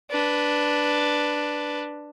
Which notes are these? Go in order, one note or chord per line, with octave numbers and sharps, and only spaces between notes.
D4 B4